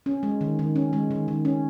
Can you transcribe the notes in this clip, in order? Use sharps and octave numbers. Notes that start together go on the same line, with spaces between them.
C#4
G#3
D#3
D#3
C#4
G#3
D#3
D#3
C#4